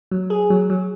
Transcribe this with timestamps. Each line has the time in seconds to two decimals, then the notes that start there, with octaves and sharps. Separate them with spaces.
0.11 F#3
0.30 G#4
0.50 F#3
0.70 F#3